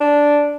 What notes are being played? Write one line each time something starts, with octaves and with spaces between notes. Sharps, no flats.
D4